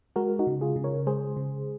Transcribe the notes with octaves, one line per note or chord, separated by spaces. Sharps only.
G#3 F#4 A#4
D#4 F#4
C#3
F4 G#4
C#3
A#4 C#5
G#3 G#4 C5
C#3